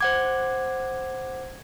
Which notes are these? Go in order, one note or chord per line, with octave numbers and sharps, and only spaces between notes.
C5 F#5 D6 G#6